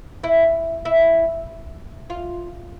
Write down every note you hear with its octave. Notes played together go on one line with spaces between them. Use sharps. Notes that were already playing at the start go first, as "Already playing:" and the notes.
E4
E4
F4